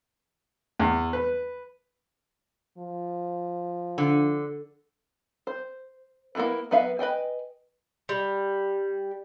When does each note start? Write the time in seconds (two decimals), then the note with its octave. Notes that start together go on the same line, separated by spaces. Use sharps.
0.79 E2
1.13 B4
2.78 F3
3.98 D3
5.47 C5
6.35 A#3 B3 E4 A4 B4
6.71 F#3 B3 B4 E5 F5
6.99 B4 D#5 G5 G#5
8.09 G3